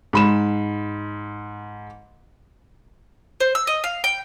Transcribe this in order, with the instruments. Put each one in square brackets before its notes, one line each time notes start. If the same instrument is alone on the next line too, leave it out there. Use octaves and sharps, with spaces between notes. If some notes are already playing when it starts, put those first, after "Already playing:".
[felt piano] G#2 B5 E7
[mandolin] C5
E6
D#5
F5
G5